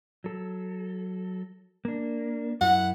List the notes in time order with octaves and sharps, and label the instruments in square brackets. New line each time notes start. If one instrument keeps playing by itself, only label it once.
[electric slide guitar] F#3 A4
A#3 D4
[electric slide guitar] F#2 E4 [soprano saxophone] F#5